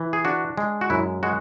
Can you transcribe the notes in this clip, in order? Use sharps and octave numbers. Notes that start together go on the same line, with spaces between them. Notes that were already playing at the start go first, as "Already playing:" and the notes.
Already playing: E3
G#4
D4 F#4
G#3
F#4
F#2 E4
G#3 F#4